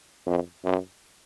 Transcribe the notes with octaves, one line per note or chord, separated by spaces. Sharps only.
F2
F#2